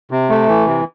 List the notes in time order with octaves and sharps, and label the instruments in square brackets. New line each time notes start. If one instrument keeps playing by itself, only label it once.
[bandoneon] C3
A3
E3
C3